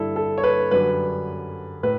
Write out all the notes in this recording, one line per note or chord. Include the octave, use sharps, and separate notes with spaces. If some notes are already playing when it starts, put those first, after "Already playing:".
Already playing: G2 D3 G3 E4 A4
A4
C#5
B4
F#2 D3 G3 B4
A2 B4